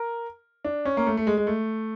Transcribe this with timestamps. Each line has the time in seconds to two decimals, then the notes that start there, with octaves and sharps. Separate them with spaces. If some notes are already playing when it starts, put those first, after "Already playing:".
Already playing: A#4
0.65 D4
0.85 C#4
0.97 A#3
1.07 A3
1.17 A3
1.27 G#3
1.37 G#3
1.47 A3